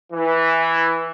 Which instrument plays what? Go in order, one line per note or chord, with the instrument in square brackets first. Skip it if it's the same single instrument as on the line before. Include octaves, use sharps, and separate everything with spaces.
[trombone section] E3